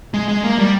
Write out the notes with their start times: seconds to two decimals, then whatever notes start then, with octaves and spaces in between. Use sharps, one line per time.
0.14 G#3
0.28 G#3
0.43 A#3
0.58 G3